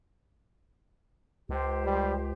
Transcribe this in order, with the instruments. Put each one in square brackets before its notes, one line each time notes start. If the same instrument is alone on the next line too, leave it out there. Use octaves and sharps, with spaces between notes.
[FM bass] C#2 [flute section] G4 C5
[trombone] G3